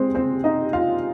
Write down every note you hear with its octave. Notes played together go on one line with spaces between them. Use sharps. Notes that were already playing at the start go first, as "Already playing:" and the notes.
Already playing: G#3 C4 C5
C4 C5
D#4 D#5
F4 F5